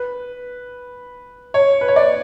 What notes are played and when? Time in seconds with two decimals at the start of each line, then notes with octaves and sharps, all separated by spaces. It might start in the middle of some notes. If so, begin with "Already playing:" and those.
Already playing: B4
1.54 C#5
1.81 B4
1.88 C#5
1.96 D5